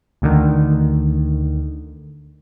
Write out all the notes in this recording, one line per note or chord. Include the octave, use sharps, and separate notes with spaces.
D2 D3 D#3